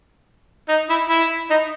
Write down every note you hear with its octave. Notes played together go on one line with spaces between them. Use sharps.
D#4
E4
E4
D#4